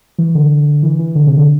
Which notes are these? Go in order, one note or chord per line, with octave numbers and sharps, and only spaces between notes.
E3
D3
E3
E3
D3
C3
D3